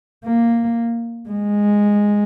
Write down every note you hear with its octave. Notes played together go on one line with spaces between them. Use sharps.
A#3
G#3